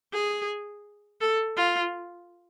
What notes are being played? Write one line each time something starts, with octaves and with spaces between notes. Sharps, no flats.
G#4
A4
F4